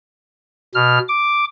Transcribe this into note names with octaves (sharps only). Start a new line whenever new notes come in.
B2 F6
D6